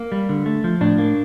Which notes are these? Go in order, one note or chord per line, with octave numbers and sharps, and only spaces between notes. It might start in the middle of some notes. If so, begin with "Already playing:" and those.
Already playing: A#3
G3
D3
A3
F3
A2 D4
A#3